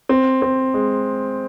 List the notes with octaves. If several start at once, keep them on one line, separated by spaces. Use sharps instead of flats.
C4
C4
G#3